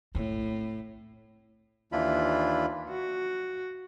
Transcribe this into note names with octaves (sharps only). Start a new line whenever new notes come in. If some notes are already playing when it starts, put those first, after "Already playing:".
A2 C4
D#2 E3 D4 E4 F4 B5
F#4